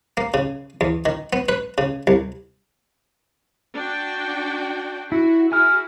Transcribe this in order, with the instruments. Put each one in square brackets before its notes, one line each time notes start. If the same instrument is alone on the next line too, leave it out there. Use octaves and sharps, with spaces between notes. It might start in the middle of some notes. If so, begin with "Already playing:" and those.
[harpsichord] A#3
C#3
E2
D#3
B3
B4
C#3
C2
[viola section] D4 F#4 G5
[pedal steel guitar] E4 [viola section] F#4
[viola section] E4 F#4 G#4 [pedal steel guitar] G#5 F6